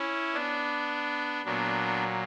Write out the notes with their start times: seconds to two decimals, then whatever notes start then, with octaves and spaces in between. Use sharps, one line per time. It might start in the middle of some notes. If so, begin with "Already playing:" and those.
Already playing: C#4 E4
0.34 B3 D4
1.45 A#2 F#3 B3 D4